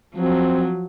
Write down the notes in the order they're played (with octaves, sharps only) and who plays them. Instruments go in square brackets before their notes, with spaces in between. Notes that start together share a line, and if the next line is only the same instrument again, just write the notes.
[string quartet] F3 F#3 [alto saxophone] C4